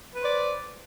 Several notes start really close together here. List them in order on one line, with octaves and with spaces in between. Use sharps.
B4 C5 D5